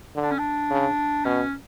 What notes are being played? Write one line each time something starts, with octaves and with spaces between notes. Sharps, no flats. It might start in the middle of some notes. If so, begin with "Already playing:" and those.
D3
D4
C#4
D4
C#3
B2 C#4